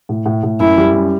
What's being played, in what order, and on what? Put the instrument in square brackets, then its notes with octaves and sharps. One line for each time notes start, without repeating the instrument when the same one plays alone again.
[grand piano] A2
A2
A2
[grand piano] F#2 [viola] E4
[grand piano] G3
F#2